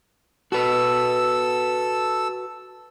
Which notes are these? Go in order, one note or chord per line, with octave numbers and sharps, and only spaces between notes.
F#4 A4 B4 E6